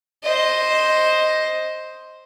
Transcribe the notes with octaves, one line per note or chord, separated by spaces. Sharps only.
C5 D#5